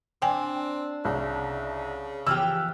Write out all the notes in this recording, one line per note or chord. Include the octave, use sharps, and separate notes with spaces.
C4 D4 G5 G#5
C2 C#3
E3 F3 G4 E6 F6